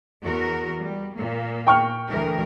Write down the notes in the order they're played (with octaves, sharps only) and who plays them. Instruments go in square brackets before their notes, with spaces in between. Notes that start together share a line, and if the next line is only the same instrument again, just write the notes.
[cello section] E2 F#4 A#4
G3
A#2 A#3
[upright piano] G5 C#6 F6
[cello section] D2 E3 A#4